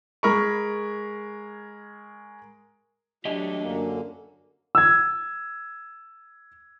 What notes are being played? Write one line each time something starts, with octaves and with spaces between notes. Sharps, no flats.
G#3 G#4 A#4 B5 C#6
F#3 A3 D4 G4 D#5
F#2 D3 A#3
E6 G#6